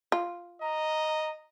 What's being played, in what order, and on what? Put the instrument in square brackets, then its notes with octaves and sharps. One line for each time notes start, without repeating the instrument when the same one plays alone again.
[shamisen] F4
[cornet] D#5 [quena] A#5